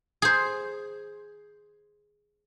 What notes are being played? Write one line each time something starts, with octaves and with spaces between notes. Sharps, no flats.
G#4 C5